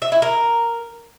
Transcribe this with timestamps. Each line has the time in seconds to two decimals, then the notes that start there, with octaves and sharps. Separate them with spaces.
0.02 E5
0.12 E4
0.22 A#4